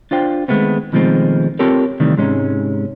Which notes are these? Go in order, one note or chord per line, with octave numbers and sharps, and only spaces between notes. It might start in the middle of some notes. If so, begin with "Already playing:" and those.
D4 F4 C5 G5
D#3 F3 G#3 A3 B3 C4
B2 D#3 F3 G#3 A3 C4
C4 F4 G4 A4 A#4 C#5
C3 D#3 E3 G3 A3
G#2 C3 G#3 C#4 D#4